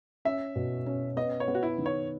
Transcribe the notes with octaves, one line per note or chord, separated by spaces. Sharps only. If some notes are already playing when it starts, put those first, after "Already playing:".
C#4 E5
B2
C#4
B3 D#5
C#5
B3
F#4
E4
D#3
C#5